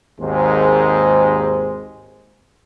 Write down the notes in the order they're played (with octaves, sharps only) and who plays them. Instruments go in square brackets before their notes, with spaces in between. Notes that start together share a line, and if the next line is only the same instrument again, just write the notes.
[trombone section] G#1 D#2 G#2 G#3 C5